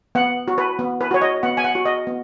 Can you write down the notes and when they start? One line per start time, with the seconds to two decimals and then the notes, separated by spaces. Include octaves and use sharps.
0.15 B3 F#5
0.48 F#4
0.58 B4
0.79 B3
1.01 B4
1.11 F#4 C#5
1.22 D#5
1.43 B3 F#5
1.57 G#5
1.64 F#5
1.75 F#4
1.85 D#5
2.07 B3